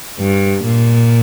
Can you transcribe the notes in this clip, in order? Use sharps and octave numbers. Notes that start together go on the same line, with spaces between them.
G2
A#2